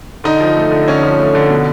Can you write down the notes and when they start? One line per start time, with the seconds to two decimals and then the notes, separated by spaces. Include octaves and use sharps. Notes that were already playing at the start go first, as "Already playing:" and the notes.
0.24 D3 D#4 D#5
0.41 F3
0.57 A3
0.72 D3
0.88 D3 C#4 C#5
1.03 F3
1.19 A3
1.35 D3
1.50 B2